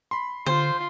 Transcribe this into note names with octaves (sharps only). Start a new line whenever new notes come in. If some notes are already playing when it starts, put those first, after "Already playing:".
B5 C6
D3 F4 C5